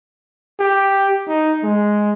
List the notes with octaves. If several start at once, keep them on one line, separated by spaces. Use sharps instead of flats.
G4
D#4
G#3